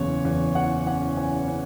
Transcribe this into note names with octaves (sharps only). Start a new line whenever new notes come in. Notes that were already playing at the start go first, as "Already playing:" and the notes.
Already playing: F#1 E2 C#5
E2
E3 F#5
C#4 F#5
E3 G#5
C#4